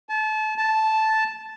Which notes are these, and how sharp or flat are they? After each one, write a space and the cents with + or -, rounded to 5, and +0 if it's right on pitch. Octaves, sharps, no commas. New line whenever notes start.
A5 -30
A5 -5